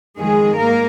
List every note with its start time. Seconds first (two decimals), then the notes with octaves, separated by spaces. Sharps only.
0.18 F2 D#3 G#3 G#4
0.57 G#2 A#3 A#4